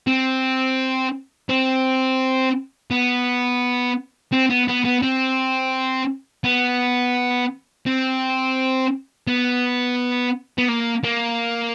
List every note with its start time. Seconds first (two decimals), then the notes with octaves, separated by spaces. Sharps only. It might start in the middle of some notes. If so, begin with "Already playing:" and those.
0.07 C4
1.49 C4
2.91 B3
4.32 C4
4.50 B3
4.68 B3
4.85 B3
5.02 C4
6.44 B3
7.87 C4
9.27 B3
10.58 B3
10.69 A#3
11.04 A#3